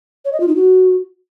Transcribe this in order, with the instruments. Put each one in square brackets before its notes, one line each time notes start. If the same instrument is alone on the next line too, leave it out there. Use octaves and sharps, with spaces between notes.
[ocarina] C#5
D#5
F4
D#4
F#4